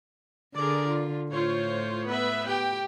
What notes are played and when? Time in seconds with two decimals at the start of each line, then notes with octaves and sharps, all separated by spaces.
0.56 D3 G#4 A#4 D5
0.88 F4
1.32 A2 F4 C5 C#5
2.06 B3 B4 E5
2.47 G4 G5